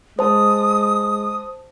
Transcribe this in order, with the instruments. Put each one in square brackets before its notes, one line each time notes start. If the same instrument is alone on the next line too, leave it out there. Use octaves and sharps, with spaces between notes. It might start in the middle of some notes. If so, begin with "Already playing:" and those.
[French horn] G#3 [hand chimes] C5 A5 [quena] D#6